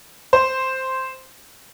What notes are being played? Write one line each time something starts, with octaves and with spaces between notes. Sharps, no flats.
C5